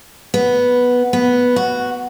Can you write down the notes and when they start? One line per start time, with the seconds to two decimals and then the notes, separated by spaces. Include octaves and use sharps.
0.34 B3
1.13 B3
1.56 F#4